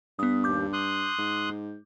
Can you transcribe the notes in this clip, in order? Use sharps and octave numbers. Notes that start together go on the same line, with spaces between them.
G2 B3 D#6
D#2 D6 G6
C6 D#6 F#6
G#2